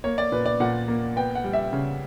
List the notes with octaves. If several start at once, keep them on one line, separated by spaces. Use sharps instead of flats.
A#3 C#5
D5
A#2 B4
D5
A#2 F#5
A#3
B3 G5
F#5
G3
E5
C#3